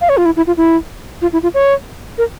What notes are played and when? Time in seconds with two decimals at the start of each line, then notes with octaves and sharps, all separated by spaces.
0.01 F5
0.09 C#5
0.17 F4
0.25 E4
0.36 E4
0.47 F4
0.57 E4
1.22 F4
1.33 E4
1.43 F4
1.54 C#5
2.18 A#4